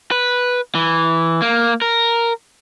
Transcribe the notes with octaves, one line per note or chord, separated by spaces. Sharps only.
B4
E3
A#3
A#4